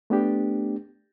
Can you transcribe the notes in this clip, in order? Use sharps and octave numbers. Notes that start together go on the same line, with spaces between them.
A3 B3 D4 G4